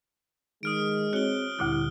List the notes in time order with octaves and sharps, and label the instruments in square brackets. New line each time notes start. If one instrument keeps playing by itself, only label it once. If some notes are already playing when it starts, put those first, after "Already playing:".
[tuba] D#3 [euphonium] G#3 [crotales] D#6 F6 D7
[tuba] C4 [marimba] F#4 C#5 [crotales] F#6 G7
[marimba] D2 A#2 D3 [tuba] G3 [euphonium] E4